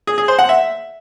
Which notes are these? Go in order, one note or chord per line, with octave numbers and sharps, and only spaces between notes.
G#4
G#4
C5
F#5
E5